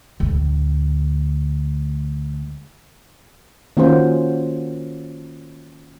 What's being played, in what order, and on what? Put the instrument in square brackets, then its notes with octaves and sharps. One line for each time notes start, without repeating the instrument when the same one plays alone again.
[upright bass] D2 A2
[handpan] D#3 A#3 C#4 F4 F#4 C5